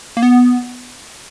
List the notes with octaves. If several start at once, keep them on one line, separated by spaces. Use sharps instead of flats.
A#3
B3